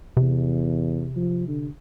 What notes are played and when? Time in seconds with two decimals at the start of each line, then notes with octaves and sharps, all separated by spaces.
0.17 E2 C3
1.16 F3
1.48 D3